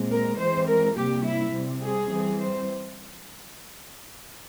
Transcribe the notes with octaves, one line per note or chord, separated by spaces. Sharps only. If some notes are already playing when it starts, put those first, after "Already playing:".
Already playing: A#2 G#3 C4
A#4
E3 G#3 C4 C5
A#4
C3 G3 A#3 G4
E4
C3 G3 C4
G#4
E3 G3 C4
C5